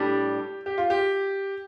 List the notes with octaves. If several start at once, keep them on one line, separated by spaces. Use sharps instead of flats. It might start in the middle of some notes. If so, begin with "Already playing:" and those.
Already playing: A2 G3 D4 G4
G4
F4
G4